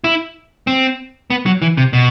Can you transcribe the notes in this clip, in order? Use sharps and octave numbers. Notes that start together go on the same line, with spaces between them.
E4
C4
B3
F#3
E3
C3
B2